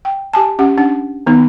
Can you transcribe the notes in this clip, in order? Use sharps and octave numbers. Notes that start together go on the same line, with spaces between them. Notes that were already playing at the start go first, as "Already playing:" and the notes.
G5
G4 G#5 A5
C#4 G4 F#5
C#4 D4 F#5
D#3 B3 D#4